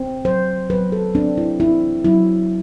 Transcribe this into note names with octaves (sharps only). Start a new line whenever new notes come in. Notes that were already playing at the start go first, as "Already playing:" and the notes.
Already playing: C4
F#3 C5
F#3 B4
A4
C4 D4
E4
C4 E4
F#3 E4